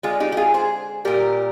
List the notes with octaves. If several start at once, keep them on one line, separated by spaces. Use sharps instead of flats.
D3 G#3 F4 G#4
D#4 G4
G4
F4 G#4
G#4 C5
A#2 G3 G4 A#4